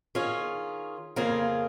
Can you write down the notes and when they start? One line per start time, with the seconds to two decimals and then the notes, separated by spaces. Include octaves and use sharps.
0.15 D#3 C#4 F4 G#4
1.16 F2 C#3 A#3 F4 G#4